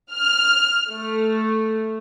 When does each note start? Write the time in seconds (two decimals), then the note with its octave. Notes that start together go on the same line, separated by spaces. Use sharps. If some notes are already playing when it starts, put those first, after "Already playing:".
0.13 F6
0.89 A3